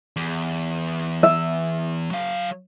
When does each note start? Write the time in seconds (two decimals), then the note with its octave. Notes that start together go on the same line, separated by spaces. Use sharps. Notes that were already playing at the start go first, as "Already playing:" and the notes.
0.16 E2
1.23 E5
2.11 F#3 F5